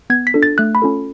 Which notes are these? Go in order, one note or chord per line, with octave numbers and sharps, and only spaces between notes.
B3 G#6
B6
D4 F4 A4
A6
A3 F#6
B5
C#4 F4 A4